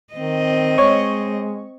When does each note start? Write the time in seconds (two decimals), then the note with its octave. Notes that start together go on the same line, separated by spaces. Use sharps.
0.14 D#3 C4 D#5
0.78 G#3 C#5 C#6